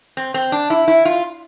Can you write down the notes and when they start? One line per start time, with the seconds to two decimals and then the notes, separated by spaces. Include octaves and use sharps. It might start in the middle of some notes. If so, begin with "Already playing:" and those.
0.17 C4
0.34 C4
0.52 D4
0.70 E4
0.88 E4
1.05 F4